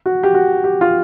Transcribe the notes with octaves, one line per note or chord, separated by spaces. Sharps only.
F#4
G4
F#4
G4
F4